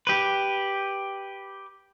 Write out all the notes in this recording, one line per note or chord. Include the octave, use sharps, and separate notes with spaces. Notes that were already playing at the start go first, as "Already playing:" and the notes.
G4 B4